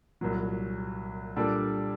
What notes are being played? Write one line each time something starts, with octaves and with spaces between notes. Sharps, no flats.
C2 A#2 F#3
A#2 G3 D4 A4